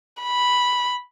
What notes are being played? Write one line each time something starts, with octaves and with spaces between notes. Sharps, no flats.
B5